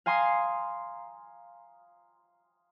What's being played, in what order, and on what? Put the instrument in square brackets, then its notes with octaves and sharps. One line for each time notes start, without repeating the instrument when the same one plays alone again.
[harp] F5 G#5 A#5 C6 D#6